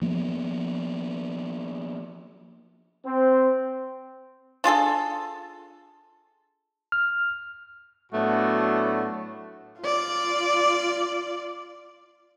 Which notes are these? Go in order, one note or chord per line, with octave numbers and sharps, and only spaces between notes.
F3 A#3 B3
C4
D4 F4 G#4 A4
F6
A2 F#3 A3 B3 D4 F#4
F4 D5